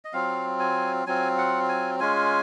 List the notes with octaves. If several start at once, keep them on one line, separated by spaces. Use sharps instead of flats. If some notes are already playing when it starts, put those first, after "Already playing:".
D#5
F#3 C4 F4 F5
G#5
F#3 C4 F4 G#5
F#5
G#5
G#3 C#4 F4 G#5